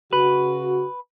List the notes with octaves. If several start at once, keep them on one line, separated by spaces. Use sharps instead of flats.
C#3 F#4 B4